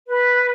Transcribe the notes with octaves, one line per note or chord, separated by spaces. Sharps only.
B4